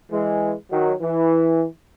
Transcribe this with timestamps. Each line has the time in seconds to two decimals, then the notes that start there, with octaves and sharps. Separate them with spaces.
0.11 E3 G#3
0.71 D#3 F#3
1.01 E3